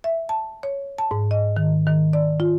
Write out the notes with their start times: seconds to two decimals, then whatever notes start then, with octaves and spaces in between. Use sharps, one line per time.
0.04 E5
0.29 A5
0.63 C#5
0.98 A5
1.11 G#2
1.31 D#5
1.57 D#3
1.87 D#3
2.13 D5
2.40 F4